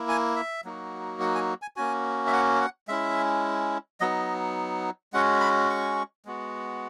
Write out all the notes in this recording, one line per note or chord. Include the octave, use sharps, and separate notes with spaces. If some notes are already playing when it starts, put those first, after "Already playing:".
Already playing: A#3 E4
G#5
E5
F#3 A#3 D#4 F#4
F#5
G#5
G#5
A#3 C#4 F#4 G#5
E5
F#5
F#5
G#3 C#4 E4 E5
F#3 B3 D#4 D#5
G#3 C#4 F#4 F#5
B5
C#6
G#3 B3 F#4